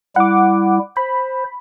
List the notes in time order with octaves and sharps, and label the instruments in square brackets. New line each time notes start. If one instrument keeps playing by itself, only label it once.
[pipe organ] G3 E4 [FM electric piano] F#5 D6
[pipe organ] C5 [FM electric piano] B5